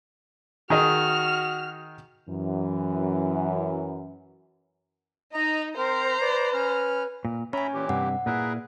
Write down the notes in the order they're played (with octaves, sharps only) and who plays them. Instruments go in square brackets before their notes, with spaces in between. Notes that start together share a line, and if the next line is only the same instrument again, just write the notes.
[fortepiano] D#3 G#4 D#5 [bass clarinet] F#4 [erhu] F6
[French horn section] F#2 E3
[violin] D#4 [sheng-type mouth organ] D#5 A#5
[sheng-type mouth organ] C4 A#4 [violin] C5 A#5
[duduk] B4 [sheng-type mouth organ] D5
[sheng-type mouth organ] C#4 F6
[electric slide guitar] A#2
[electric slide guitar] C#4 [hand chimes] C#5 G#5 [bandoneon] E5 A#5 B5
[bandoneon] A#2 E3 G4
[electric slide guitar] G2 C3 [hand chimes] F#5
[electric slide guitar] A#2 E4 [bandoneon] G#4 A#4 B4